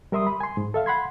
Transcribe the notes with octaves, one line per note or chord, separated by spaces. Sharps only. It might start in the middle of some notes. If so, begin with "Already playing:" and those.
G3 A#4 E5 C6 D#6
B5
G#5 C6
G#2
A4 E5 F5
F#5 B5 C6 G#6